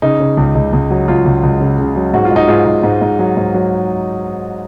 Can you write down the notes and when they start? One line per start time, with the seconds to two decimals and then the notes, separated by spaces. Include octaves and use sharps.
0.02 C#3 D#4
0.20 C#3
0.37 C#2
0.55 C#2
0.73 C#2
0.90 F#3
1.08 C#2 F4
1.25 C#2
1.43 C#2
1.61 C#3
1.78 C#3
1.96 F#3
2.13 G#2 F#4
2.25 F4
2.31 G#2 D#4
2.48 G#2 F4
2.66 G#2
2.83 G#2
3.01 G#2
3.19 F#3
3.37 G#2
3.54 F#3